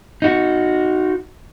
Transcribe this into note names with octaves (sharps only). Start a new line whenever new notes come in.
D#4 F#4